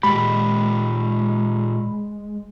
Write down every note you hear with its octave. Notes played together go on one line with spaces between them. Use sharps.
A#2 G#3 G4 B5